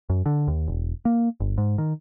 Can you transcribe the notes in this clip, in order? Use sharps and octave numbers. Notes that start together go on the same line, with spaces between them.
F#2
D3
D#2
E1
A#3
G1
G#2
D#3